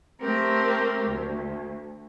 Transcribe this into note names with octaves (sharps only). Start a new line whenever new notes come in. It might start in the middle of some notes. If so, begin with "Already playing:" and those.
A3 C4 G4 A#4
D2